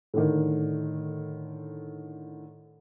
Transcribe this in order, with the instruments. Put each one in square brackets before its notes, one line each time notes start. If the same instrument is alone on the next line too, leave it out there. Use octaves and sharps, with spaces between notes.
[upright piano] A2 D3 D#3